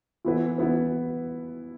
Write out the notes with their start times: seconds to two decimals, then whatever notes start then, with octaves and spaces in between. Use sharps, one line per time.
0.25 E3 B3 E4 B4
0.58 E3 B3 E4 B4